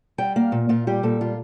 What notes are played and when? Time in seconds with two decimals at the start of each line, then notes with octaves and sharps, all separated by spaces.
0.18 G3 G5
0.36 A#3 F5
0.52 A#2
0.69 A#2 F4
0.87 G3 G4
1.03 A#2 A4
1.21 G3 F4